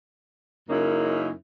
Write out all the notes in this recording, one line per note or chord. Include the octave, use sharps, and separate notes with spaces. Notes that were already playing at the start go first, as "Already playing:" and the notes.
F#2 C#3 A#3 C#4 D#4 E4